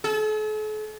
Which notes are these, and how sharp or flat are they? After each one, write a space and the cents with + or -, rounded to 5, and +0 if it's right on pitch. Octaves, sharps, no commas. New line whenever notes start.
A4 -45